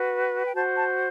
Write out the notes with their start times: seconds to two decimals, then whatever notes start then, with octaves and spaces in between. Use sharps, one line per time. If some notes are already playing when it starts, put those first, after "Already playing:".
Already playing: F#4 B4
0.45 G5
0.53 F#4 A5
0.56 C5
0.76 A5